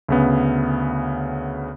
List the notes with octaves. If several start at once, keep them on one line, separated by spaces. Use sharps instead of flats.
D2 C#3 B3